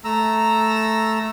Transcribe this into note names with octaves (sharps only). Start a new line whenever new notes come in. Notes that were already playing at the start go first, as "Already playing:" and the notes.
A3 A#5 E6